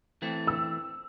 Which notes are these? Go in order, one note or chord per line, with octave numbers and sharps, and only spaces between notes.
E3 A3 C4
E6